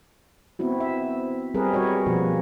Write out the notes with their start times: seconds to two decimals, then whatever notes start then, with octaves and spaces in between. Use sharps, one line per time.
0.59 B3 C4 E4 F#4
0.80 E5
1.54 G3 C4 G#4 A#4 B4
1.73 G3 F#4 B4 C#5 D#5
2.06 B2 F3 A#3 F#4